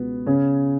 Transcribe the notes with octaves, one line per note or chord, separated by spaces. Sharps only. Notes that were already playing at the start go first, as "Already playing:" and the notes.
Already playing: C#2 B2 B3
C#3 C#4